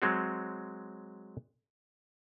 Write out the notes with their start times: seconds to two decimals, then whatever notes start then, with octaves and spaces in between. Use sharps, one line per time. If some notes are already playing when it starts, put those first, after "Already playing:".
0.02 F#3 G#3 C4 F#4